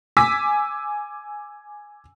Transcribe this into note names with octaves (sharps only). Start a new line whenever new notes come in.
G#5 D6 E6 B6